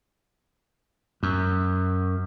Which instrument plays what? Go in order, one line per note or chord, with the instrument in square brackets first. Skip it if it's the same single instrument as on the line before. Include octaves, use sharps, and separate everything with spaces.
[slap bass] F#2